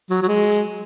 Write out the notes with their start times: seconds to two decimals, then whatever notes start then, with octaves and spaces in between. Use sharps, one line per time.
0.10 F#3
0.23 F#3
0.28 G#3